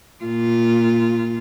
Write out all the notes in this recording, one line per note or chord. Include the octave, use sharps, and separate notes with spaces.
A#2 F4